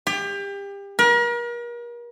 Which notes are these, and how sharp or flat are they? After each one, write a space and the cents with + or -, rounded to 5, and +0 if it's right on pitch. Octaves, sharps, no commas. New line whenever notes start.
G4 +30
A#4 +40